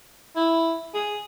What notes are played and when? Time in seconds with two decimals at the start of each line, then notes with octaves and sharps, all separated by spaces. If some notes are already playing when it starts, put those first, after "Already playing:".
0.36 E4
0.94 G#4